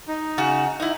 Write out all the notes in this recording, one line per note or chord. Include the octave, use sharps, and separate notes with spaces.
D#4
C#3 F#4
D#4 E4